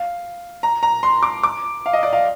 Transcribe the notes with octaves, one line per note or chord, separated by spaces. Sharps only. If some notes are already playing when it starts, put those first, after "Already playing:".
Already playing: F5
A#5
A#5
C6
D6
D6
F5
D#5
D5
F5